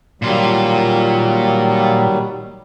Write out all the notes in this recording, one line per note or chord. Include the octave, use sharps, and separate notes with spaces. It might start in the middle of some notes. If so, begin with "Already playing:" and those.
A#2 D#3 F#3 G3 F4